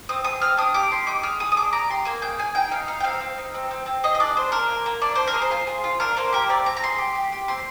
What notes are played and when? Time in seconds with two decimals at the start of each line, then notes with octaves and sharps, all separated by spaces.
0.09 C4 D#6
0.24 G#4 D#6
0.42 C4 F6
0.57 D4 D#6
0.74 G4 D6
0.91 G4 C6
1.07 D#4 D6
1.23 G#4 F6
1.40 G#4 D#6
1.52 D#6
1.56 D4 D6
1.73 D4 A#5
1.90 G4 C6
2.05 A#3 G#5
2.22 G#4 G5
2.39 G#4 G#5
2.55 D#4 G5
2.71 D#4 F5
2.88 D#4 F5
3.00 G5
3.04 C4 F5
3.21 C4
3.38 D#4
3.54 C4
3.71 C4
3.86 C4
4.04 G#4 D#5
4.15 D#5
4.20 D4 D5
4.36 G#4 C5
4.52 D4 A#4
4.68 A#3
4.86 A#3
5.01 D4 D5
5.15 D4 C5
5.27 A#4
5.34 G#4
5.42 C5
5.51 F4
5.67 G#4
5.84 F4
6.00 D4 A#4
6.17 A#3 C5
6.33 G4 A#4
6.49 C4 D5
6.66 C4 A#5
6.77 A#5
6.83 G#4 C6
6.98 G4
7.15 G4
7.32 G4
7.48 C4 C6